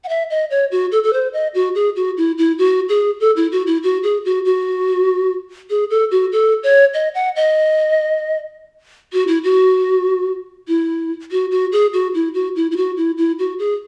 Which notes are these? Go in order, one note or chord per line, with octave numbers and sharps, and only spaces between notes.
F#5
E5
D#5
C#5
F#4
A4
A4
C5
D#5
F#4
G#4
F#4
E4
E4
F#4
G#4
A4
E4
F#4
E4
F#4
G#4
F#4
F#4
G#4
A4
F#4
A4
C#5
D#5
F#5
D#5
F#4
E4
F#4
E4
F#4
F#4
G#4
F#4
E4
F#4
E4
E4
F#4
E4
E4
F#4
G#4